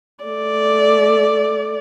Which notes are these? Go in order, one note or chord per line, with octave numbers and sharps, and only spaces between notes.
A3 D5